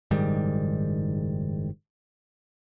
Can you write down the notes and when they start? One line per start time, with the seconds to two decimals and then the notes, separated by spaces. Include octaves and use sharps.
0.11 F#1 G#2 D#3 G3